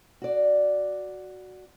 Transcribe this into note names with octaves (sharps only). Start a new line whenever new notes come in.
F#4 D5